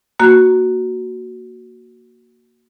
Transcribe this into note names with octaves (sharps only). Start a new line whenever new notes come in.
A#3 F#4